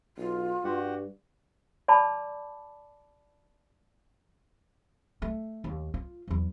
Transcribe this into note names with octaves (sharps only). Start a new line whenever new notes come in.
B1 F4
G2 F#4 G4 F#5
D5 A5 B5 D6
A3
D#2
F4
E2 F#3